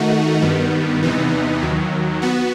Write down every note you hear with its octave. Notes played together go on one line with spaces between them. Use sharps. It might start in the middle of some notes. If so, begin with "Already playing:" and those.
Already playing: D#3 A3 D#4 F#4
G2 D#3 G3 B3
E2 C3 E3 B3 D#4
D#2 D#3 F#3
B3 F#4